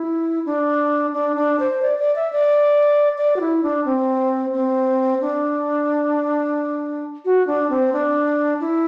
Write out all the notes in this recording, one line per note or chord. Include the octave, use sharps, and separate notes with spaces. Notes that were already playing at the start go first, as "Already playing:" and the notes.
Already playing: E4
D4
D4
D4
C5
D5
D5
E5
D5
D5
F#4
E4
D4
C4
C4
D4
F#4
D4
C4
D4
E4